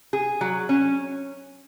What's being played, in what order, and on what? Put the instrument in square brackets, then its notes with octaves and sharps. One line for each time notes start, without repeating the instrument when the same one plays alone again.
[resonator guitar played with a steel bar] G#4
F#3
C#4